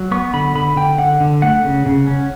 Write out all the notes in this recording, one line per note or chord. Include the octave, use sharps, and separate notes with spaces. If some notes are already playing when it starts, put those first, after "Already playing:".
Already playing: F#3
B3 C#6
D3 B5
D3 B5
D3 G5
D3 F#5
D3
A3 F#5
C#3
C#3
C#4